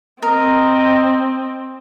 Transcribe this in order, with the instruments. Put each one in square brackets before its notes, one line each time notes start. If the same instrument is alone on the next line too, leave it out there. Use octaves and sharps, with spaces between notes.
[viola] C4 [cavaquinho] A#4 [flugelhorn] D#5